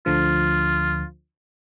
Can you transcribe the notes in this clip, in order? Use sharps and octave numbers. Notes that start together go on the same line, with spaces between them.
D2 D3 F3 F4